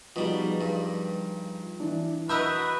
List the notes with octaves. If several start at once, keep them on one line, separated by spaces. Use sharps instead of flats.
B2 F3 G3 D#4 G#4
G2
E3 D4
F#4 A#4 B4 D#5 E5 B5 E6 G6